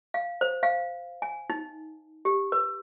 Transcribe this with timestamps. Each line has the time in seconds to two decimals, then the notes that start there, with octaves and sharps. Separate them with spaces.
0.14 F5
0.41 C5
0.63 F5
1.22 G#5
1.50 D#4
2.25 G4
2.52 B4